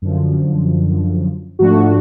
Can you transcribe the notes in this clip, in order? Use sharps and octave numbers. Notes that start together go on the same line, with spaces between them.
F#2 D3 F3
G#2 F3 A3 D4 F#4